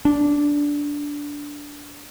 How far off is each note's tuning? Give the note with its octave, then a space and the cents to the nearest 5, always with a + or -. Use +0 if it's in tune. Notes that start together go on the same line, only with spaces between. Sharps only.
D4 -10